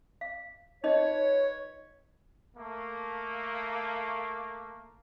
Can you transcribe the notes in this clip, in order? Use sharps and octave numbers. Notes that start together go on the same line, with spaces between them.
F5
D#4 F4 A#4 B4 C#5 D#5
A3 A#3